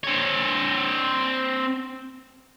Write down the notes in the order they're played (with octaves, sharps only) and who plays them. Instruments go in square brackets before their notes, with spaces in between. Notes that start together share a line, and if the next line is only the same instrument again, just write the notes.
[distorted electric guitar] C4 C#5